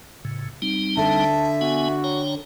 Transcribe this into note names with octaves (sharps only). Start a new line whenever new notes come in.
A2 C#3
G3 C4 D#4
D3 E5 A5
B3 F#4 G#5
C#5 G5 A#5